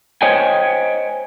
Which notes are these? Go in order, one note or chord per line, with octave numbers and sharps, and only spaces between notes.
C5 C#5 D#5 G5 G#5